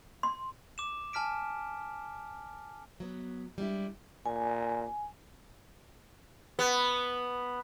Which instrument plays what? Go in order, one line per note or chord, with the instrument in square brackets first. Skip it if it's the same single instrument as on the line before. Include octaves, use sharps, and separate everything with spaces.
[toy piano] C6
[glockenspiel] D6 E7
G#5 A5 F6 B6 D7
[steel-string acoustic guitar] F#3 B3
G3 G#3 D4 E4
[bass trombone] A#2 [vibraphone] G#5
[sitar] B3